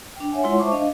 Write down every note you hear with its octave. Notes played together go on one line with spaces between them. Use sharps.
D4 G5
C#5 E5 F#5 G#5
G#3 E4 F4 C#5 F#5 C6
C5 E5 A5 C#6 D6
D4 D#5 F5